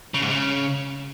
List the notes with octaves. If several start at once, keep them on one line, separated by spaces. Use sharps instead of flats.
C#3
G#2
C#3